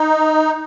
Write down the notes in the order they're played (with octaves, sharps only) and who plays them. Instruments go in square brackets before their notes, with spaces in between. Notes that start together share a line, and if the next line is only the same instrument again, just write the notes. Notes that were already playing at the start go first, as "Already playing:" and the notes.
Already playing: [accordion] D#4